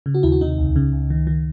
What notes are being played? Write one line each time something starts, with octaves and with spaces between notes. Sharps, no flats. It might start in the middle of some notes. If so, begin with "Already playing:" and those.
C#3
F#4
D#2 E4
F#4
C3 D#4
C#2
C#3
C#2
D#3
D#3